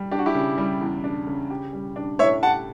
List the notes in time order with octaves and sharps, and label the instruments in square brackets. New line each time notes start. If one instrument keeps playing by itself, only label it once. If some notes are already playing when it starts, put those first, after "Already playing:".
Already playing: [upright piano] G3
[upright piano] D4 [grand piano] G4
[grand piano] F#4
E4 G4
[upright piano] C#3
G3
E2
D4
C#3
G4
G3
D4
[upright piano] A2 [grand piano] C#5 E5
[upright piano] G4 [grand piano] F#5 A5